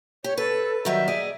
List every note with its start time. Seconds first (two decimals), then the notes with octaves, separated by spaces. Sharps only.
0.24 G4 C#5
0.37 A4 B4
0.85 D#3 F#3 G3 E5
1.08 G#4 D5 D#5